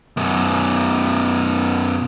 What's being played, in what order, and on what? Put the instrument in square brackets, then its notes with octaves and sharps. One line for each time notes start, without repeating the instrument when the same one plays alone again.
[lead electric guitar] F#2 B2